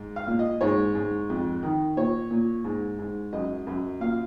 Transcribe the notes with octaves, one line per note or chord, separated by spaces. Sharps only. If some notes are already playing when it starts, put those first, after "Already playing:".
Already playing: G#2
F5
A#2
D#5
G#2 C#5
G#2
F2
D#3
A#2 C#5
A#2
G#2
G#2
F#2 D#5
F#2
A#2 F5